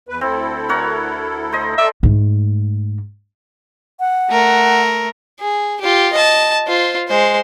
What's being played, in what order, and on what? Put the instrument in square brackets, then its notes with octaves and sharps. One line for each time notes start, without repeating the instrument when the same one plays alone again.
[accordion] E2 B4
[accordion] D2 E4 A4 [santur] C4
[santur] A#4 C#5 F#5
C5 D#5
[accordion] A4 [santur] D5 [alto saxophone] E5
[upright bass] G#2 A3
[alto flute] F#5
[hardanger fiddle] A3 A#4
G#4
F4 G4
D#5 A5
F4 C5
G#3 C5